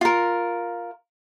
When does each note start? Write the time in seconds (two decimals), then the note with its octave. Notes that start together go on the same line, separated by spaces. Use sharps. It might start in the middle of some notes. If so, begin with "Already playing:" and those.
0.01 F4 A#4